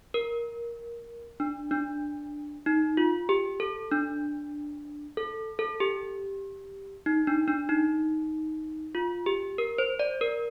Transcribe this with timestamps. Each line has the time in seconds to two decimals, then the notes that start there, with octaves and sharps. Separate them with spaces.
0.14 A#4
1.40 D4
1.71 D4
2.66 D#4
2.97 F4
3.29 G4
3.60 A4
3.91 D4
5.17 A4
5.59 A4
5.80 G4
7.06 D#4
7.27 D4
7.48 D4
7.69 D#4
8.95 F4
9.26 G4
9.58 A#4
9.78 C5
9.99 D5
10.21 A#4